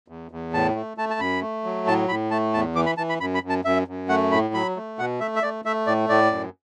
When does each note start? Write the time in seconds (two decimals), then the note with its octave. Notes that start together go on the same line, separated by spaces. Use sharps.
0.08 E2
0.31 E2
0.54 A2 A5
0.75 A3
0.97 A3 A5
1.10 A5
1.19 F#2 B5
1.42 A3
1.64 F#3
1.87 A2 A5
2.09 A2 B5
2.31 A3 A5
2.54 E2 A5
2.75 E3 D6
2.86 B5
2.98 E3 A5
3.09 B5
3.21 F#2 B5
3.35 B5
3.43 F#2
3.49 A5
3.65 F#2 E5
3.88 F#2
4.09 A3 F#5
4.32 A2 B5
4.54 F#3 B5
4.76 A3
4.99 B2 F#5
5.20 A3 E5
5.36 E5
5.43 A3 D5
5.65 A3 E5
5.87 A2 D5
6.09 A2 D5
6.31 F#2